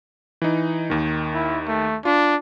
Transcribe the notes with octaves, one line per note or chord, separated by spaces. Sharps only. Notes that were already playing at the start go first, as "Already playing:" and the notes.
E3 D#4
D#2 D#3
E4
A3
D4 F4